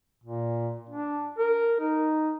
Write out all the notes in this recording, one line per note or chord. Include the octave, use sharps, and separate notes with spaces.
A#2
D4
A#4
D#4